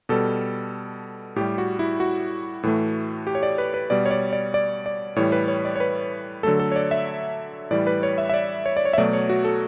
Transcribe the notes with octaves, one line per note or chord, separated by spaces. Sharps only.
B2 G3 A4
A2 G3 G4
F#4
E4
F#4
A2 E3 A3
G4
C#5
D5
B4
B4
B2 G3 D5
C#5
D5
D5
D5
D5
A2 E3 G3 C#5
B4
C#5
D5
C#5
B4
D3 F#3 A3 A4
A4
C#5
D5
E5
A2 E3 G3 D5
B4
C#5
E5
E5
D5
C#5
D5
C#5
E5
B2 F#3 A3 D5
C#5
F#4
A4